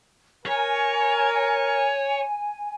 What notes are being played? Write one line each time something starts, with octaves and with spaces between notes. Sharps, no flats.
A#4 C#5 G#5